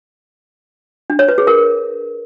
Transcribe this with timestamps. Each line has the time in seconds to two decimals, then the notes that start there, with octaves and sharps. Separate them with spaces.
1.10 D4
1.19 C#5
1.28 B4
1.38 G#4
1.47 A#4